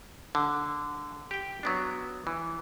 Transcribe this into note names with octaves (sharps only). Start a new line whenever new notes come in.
D3
G4 G5
F#3 B3 D4
E3